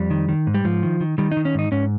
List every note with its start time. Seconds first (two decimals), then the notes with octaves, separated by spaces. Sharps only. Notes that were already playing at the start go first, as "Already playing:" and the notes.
Already playing: F2 G3
0.10 D#3
0.29 D#3
0.47 G#2
0.54 G3
0.65 G#2 F3
0.83 D#3
1.00 D#3
1.18 D#3 G3
1.31 D#4
1.37 D#3
1.45 C#4
1.54 G#2 D#4
1.72 G#2 C#4